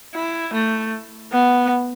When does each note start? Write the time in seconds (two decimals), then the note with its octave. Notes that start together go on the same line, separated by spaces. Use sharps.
0.14 E4
0.53 A3
1.33 B3